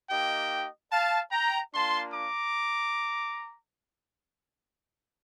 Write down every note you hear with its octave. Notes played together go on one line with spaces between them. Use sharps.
A#3 D#4 G4 D#5 G5
F5 A5
G5 A#5
A#3 D4 F4 A5 C6
A#5 D6